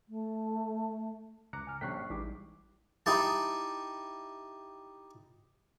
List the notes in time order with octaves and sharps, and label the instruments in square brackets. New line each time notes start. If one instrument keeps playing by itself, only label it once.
[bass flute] A3
[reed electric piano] C#2 A#5 D6 [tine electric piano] F#6 [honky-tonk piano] C#7
[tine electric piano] G#5 F6
[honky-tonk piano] A#1 C#4 C7 [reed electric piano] G3 G5 [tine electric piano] C#6 F#6 B6
[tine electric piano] A1 D6 [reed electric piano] E3 G3 E4 [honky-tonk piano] G#3 D#4
[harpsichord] D#4 E4 G4 A5